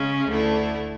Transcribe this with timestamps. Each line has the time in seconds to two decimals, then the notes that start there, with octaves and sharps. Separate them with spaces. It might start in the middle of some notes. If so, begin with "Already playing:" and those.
Already playing: C#3 G#3 C#4
0.27 D2 D3 A3 E4